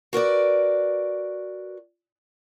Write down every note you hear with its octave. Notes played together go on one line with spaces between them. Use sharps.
F#4 A#4 B4 D5